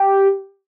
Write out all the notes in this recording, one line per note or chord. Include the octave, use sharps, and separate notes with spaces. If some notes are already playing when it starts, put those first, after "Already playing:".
Already playing: G4